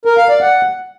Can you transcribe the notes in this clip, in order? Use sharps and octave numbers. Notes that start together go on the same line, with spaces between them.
A#4
F5
D5
F#5